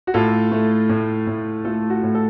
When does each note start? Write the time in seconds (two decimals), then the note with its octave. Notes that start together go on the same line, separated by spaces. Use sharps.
0.07 F#4
0.14 A2 F4 A4
0.51 A3
0.89 A2
1.27 A2
1.65 A3 F4 A4
1.90 F#4
2.03 A2
2.15 A4